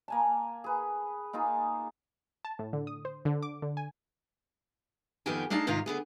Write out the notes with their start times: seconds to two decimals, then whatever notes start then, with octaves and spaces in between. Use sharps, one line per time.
0.08 A#3 G#5 A5
0.64 G#4 B4
1.33 A#3 D#4 F4 G#4
2.45 A5
2.59 A2
2.73 D3
2.87 D#6
3.05 C5
3.25 D3
3.43 D6
3.62 D3
3.77 G#5
5.26 F2 D#3 B3 G4 G5 G#5
5.50 A3 D4 D#4 G#4 F5 A5
5.67 G#2 C3 D#3 F4
5.86 D3 B3 G#4